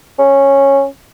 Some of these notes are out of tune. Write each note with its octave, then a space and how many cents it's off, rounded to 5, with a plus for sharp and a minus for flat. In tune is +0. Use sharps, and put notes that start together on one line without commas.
C#4 -10